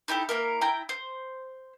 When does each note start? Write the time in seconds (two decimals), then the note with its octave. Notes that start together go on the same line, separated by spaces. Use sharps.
0.08 D#4 E4 G4 A4
0.29 A#3 E4 A#4
0.61 E4 G5 A#5
0.89 C5